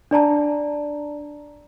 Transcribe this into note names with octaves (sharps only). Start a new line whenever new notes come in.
D4 D5 A5 A#5